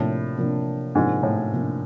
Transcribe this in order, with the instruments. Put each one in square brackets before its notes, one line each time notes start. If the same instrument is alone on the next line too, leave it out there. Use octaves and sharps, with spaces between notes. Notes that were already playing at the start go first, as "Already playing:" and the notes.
Already playing: [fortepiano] A2 [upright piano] C3 F3 A#3 D4
[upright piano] C3 F3 A#3 D4
[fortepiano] G#2 [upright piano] C3 F3 A#3 D4
[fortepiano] A2
[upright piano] C3 F3 A#3 D4